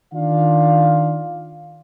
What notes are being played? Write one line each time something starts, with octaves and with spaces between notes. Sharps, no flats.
D#3 D4 F4 F5